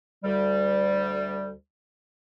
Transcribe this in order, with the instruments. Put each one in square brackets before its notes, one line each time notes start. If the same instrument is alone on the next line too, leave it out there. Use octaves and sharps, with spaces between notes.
[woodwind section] D2 G3